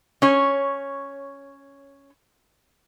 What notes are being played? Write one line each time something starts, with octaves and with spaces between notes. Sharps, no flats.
C#4 C#5